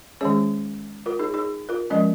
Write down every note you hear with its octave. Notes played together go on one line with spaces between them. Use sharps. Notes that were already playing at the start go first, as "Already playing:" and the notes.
D#3 G#3 C#4 G#4 C#5
F4 A#4
D#4 G#4
D#4 G#4
F4 A#4
F3 G#3 C#4 A#4 D#5